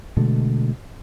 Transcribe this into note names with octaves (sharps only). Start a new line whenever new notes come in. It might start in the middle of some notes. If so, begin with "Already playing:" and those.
B2 D3 G#3 A3